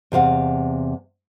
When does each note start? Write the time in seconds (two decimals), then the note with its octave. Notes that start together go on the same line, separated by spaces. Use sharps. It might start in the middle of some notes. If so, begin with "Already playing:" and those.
0.12 E2 C3 F5 F#5